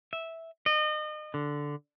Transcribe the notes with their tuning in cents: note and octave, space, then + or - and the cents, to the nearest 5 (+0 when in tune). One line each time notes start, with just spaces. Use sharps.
E5 -10
D#5 -35
D3 -5